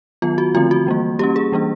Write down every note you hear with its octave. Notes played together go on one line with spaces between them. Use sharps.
D#3 F#3 B3 F4
F#4
D3 F3 A3 C4 F4
F#4
E3 G3 A#3
G3 A#3 C#4 G4
G#4
E3 G3 A#3 D4